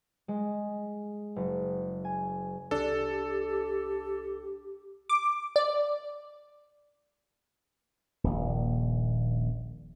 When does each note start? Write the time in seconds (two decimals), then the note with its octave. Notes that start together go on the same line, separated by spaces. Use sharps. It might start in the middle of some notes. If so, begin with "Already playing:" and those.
0.28 G#3
1.36 F#1
2.05 G#5
2.71 C2 D4 G4 A4
5.09 D6
5.56 D5
8.24 D#1 A#1